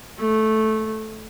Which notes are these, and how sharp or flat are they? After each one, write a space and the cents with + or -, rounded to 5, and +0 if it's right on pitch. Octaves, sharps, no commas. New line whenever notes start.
A3 -10